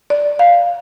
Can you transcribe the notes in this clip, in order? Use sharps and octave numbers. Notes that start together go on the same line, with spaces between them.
D5
F5